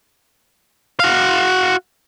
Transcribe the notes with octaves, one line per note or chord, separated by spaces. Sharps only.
F#4 F5